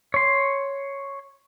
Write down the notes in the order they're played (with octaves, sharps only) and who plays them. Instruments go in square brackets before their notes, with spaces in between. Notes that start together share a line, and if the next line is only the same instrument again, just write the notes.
[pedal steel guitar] C#5 C6